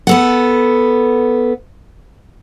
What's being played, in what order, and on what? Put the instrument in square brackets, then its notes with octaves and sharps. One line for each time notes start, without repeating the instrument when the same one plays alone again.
[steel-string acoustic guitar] B3 A4 F#5